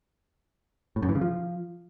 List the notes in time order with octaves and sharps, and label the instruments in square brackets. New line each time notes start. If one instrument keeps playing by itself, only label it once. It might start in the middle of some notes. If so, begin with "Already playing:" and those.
[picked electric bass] A2
F#2
E3
C#3
F3